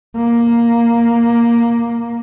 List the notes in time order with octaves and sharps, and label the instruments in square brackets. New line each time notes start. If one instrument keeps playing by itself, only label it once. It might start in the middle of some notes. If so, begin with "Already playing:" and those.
[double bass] A#3